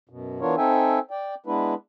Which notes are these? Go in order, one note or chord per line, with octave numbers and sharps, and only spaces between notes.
F#2 B2
E3 B3 D4 F4 A#4 C#5
C4 D#4 A4 E5 G5 G#5
D5 G5
G#3 B3 D4 E4 B4